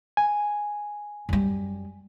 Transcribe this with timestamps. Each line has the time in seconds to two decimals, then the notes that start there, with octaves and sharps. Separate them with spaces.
0.17 G#5
1.29 F#2 G3